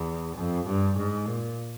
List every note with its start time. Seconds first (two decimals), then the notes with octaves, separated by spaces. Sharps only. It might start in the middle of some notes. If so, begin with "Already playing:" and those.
Already playing: E2
0.37 F2
0.66 G2
0.97 G#2
1.26 A#2